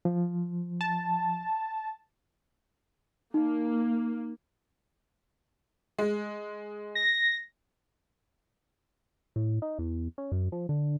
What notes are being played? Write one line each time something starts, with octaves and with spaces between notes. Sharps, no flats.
F3
A5
A#3 D#4
G#3
A#6
A2
D#4
E2
C#4
F#2
F3
D3